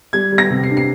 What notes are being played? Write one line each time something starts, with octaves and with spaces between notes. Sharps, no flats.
G3 G#6
G3
A#6
C3
C7
D4
C7